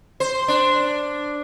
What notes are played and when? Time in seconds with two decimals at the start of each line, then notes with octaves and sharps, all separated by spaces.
0.20 C5
0.48 D4